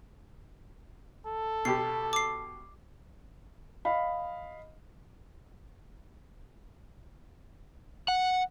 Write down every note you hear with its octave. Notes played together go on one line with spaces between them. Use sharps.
A4
B2 G4 C7
D6 C7
D#5 F5 B5
F#5